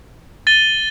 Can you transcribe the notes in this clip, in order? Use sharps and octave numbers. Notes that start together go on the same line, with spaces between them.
A6 D#7 G7